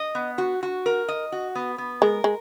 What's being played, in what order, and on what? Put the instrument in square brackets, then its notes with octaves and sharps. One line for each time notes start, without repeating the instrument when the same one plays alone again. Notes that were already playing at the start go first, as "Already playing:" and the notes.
Already playing: [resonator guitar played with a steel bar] D#5
B3
F#4
F#4
A#4
D#5
F#4
B3
B3
[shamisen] G#3 [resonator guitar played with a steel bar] A#4
[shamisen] G#3